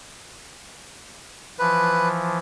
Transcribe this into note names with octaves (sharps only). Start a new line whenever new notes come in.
E3 F3 B4